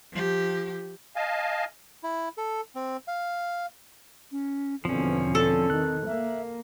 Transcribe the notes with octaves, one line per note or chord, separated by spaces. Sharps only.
F3 G4
D#5 F5 G#5 A5
E4
A4
C4
F5
C#4
E2 B2 D3 F3 C4 C#4
D3 A4
D#3 F#6
A#3 E5